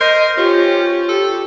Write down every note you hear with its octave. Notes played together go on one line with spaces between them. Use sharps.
A#4 C5 D#5
C#4 F4 G4
G4 A4